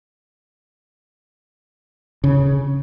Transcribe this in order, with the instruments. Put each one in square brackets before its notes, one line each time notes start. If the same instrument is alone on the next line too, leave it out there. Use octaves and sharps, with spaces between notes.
[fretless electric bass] C#3